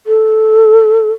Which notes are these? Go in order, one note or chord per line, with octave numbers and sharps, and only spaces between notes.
A4